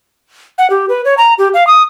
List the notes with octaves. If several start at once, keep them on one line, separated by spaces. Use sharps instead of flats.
F#5
G4
B4
C#5
A#5
G4
F5
D#6